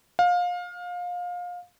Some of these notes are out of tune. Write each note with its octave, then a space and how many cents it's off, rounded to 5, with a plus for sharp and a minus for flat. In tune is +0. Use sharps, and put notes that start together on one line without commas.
F5 +25